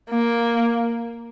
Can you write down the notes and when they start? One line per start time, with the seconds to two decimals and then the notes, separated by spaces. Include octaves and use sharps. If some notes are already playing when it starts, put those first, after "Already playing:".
0.10 A#3